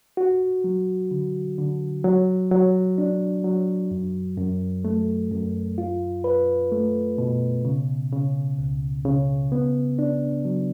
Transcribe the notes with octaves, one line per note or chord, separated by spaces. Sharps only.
F#4
F#3
D3
D3
F#3
F#3
D4
F#3
F#2
F#2
A3
F#2
F4
B4
A3
B2
C#3
C#3
C#2
C#3
B3
D4
F#3